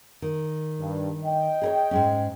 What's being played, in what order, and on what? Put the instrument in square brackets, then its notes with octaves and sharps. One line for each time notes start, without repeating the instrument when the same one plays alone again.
[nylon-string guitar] D#3
[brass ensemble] G2
D#5 G5
[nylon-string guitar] G#4 A#4 C#5
G#2 G#3 C#4